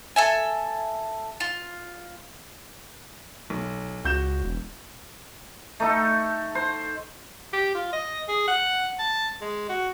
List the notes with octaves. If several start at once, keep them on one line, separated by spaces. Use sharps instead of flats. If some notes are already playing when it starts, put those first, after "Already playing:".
A4 E5 G#5
F4
B1
C#2 F#4 G6 E7
E1
A3 D#4 A4
C5
G4
F4
D#5
G#4
F#5
A5
G#3
F#4